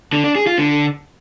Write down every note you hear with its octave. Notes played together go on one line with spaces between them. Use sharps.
D3
D4
G#4
F4
D3